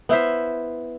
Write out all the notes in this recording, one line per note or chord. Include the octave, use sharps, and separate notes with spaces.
B3 E4 C5 E5